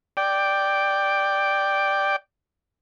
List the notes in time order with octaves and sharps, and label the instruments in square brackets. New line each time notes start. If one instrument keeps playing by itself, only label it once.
[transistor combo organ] D5 G5